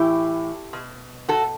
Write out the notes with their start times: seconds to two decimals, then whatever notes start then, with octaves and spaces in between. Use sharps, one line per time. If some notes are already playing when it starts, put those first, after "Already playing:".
Already playing: A2 E3 E4 G4
0.73 B2
1.29 F#4 A4